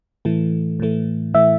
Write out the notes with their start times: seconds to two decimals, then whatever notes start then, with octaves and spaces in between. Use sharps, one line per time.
0.25 A2 E3 A3
0.80 A2 E3 A3
1.34 A2 E3 A3 E5